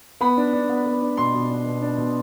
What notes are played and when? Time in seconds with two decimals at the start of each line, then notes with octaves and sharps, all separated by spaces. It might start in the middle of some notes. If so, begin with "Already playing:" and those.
0.21 B3 B5
0.37 D4
0.53 D4
0.69 B3
0.86 B3
1.02 D4
1.17 B2 C6
1.34 B2
1.50 D4
1.66 B2
1.82 D4
1.98 B2